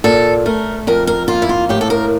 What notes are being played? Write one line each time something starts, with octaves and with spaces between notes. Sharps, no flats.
A#2 A4
A3 A#4
F2 A#4
A#4
A#3 F4
E4
F4
A2 G4
A4
A#4